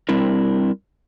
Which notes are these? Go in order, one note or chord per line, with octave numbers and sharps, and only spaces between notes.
G3 C4 D4 E4 A#4